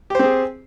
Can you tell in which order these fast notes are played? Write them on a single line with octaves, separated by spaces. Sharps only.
G4 C5 C4 G#4